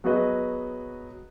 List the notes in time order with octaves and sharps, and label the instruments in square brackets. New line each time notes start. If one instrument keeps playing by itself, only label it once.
[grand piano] F#3 B3 F#4 G#4 B4 D#5